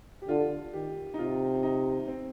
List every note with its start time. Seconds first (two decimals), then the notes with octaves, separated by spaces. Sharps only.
0.22 G4
0.28 D3 F4
0.73 D#3 G4
1.14 D#4
1.18 C3 F4
1.63 D#4
2.08 C4